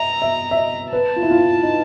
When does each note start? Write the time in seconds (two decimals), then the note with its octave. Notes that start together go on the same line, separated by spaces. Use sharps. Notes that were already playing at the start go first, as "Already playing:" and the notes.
Already playing: D#5 E5 A#5
0.22 E5
0.51 E5
0.57 D#5
0.92 B4 A5
1.16 F4
1.22 E4
1.31 F4
1.39 E4
1.63 D#4